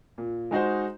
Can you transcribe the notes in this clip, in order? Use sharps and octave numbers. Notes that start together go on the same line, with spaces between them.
A#2
G#3 D#4 F#4 C5